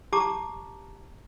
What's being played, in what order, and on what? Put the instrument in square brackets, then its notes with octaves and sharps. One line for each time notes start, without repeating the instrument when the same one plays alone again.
[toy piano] G4 A5 A#5 D6